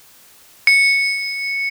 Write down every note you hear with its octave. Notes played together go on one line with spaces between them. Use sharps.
C#7